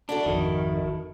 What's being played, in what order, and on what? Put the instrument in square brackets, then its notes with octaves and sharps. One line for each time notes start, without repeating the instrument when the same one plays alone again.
[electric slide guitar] D4 [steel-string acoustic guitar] E4 F#4 A4
[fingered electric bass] G#1 F2 [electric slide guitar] D#3